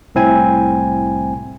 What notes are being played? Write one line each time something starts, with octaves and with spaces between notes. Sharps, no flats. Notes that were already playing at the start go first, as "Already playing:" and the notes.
C2 A2 C4 E4 G#5